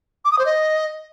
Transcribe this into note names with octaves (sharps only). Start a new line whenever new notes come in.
D6
D#6
C5
D#5